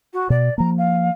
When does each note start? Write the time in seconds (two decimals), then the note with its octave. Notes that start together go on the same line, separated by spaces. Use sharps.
0.13 F#4
0.30 B2 D5
0.58 F3 A#3 A#5
0.78 F5